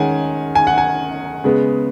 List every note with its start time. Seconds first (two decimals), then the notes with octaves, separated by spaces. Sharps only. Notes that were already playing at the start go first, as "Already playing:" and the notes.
Already playing: D#3 G#3 C#4 F#5 G#5
0.55 G#5
0.67 F#5
0.78 G#5
1.44 C#3 G#3 B3